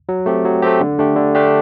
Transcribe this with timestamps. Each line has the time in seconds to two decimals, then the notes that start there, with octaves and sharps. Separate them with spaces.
0.09 F#3
0.26 A3 C4 G4
0.45 F#3
0.63 A3 C4 G4
0.81 D3
0.99 A3 D4 G4
1.16 D3
1.35 A3 D4 G4